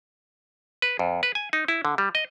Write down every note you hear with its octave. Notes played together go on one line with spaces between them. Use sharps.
B4
F2
B4
G#5
D#4
E4
D3
G3
D#5